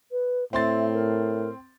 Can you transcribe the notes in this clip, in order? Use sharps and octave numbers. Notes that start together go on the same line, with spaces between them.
B4
A2 C4 E5 C6 A6
A#4